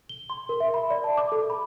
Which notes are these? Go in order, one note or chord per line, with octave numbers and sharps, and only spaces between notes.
G7
C6
A#4
E5
B5
D5
A5
D6
A4
B5